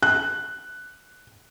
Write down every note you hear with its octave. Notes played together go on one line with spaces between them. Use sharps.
F#6